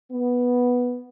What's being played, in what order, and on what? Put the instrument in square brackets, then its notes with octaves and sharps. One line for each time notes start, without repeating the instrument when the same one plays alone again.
[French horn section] B3